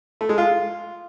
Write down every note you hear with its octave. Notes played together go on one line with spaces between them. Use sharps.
A3
G#3
F4